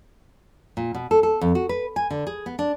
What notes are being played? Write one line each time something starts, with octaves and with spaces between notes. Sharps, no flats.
A#2
B2
A4
A4
F2
F#4
B4
G#5
D3
G#4
B3
D4